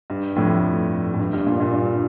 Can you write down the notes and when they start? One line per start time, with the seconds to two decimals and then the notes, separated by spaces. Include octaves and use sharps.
0.10 G2
0.36 F2 A2
1.14 A2
1.19 G2
1.33 G2
1.46 G2 A#2
1.60 G2 A#2
1.74 G2